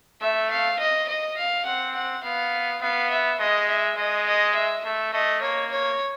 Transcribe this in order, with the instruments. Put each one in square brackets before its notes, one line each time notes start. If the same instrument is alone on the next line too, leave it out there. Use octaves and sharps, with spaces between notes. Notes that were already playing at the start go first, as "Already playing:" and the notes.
[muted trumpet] A3 [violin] E5
[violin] F5
D#5
D#5
F5
[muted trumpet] C4 [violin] F#5
[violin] F#5
[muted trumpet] B3 [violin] F5
[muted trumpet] B3 [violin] F5
[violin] E5
[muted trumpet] G#3 [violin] D#5
[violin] E5
[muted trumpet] G#3 [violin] D#5
[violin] D#5
E5
[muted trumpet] A3 [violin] E5
[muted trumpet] A3 [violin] D#5
[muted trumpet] A#3 [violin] C#5
[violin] C#5